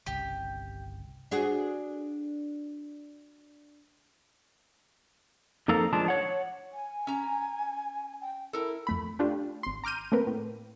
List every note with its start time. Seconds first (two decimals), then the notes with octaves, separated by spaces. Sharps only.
0.06 G1 C2 C#3 G4
1.31 D4 F#4 G#4
5.68 F2 A#3 D#4 A4 A#4 F5
5.93 F3 G#3 D4 A5
6.08 C#5 F#5
6.73 G#5
7.07 C#4 A#5
8.21 G5
8.53 E4 A4 A#4
8.87 F2 A3 B5
9.19 A3 D4 F4 G4
9.63 G#1 C6
9.84 A#5 D6 F6 G6 D#7
10.12 A3 A#3 C4 A#4 B4
10.27 A2